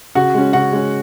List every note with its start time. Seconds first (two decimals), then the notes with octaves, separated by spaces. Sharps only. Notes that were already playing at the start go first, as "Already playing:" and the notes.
0.15 C#3 F#4 F#5
0.34 G#3 C#4
0.53 C#3 F#4 F#5
0.72 G#3 C#4